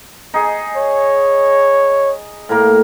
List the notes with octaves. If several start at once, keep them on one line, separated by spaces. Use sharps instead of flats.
D#4 G#4
C#5
A2 A#3